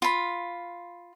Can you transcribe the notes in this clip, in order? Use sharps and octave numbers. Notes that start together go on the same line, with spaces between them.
F4 B5